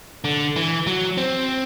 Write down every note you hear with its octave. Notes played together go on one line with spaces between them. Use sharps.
D3
E3
F#3
C4